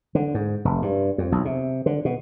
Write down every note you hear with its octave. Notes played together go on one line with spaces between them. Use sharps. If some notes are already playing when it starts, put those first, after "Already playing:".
D3
G#2
F1
G2
F2
B1
C3
D3
B2